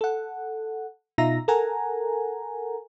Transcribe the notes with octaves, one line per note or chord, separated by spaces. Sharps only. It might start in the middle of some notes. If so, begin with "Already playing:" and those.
A4 F#5
B2 D#4 F4 E5 A#5 A#6
A4 A#4 F#5 G#5 A#5